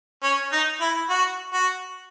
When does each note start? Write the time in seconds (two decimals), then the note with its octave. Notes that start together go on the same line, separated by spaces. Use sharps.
0.23 C#4
0.52 D#4
0.81 E4
1.10 F#4
1.53 F#4